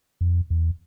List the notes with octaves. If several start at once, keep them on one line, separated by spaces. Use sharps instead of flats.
F2
E2